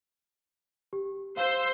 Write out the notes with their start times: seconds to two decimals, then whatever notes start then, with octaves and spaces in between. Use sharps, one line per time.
0.93 G4
1.37 C5 F5 C6 E6